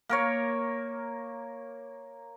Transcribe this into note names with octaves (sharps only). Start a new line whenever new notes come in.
A#3 A#4 C#5